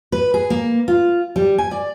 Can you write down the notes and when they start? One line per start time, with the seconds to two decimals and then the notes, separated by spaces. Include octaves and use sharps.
0.12 B4
0.34 G#4
0.50 A#3
0.88 F4
1.36 G3
1.58 G#5
1.71 D5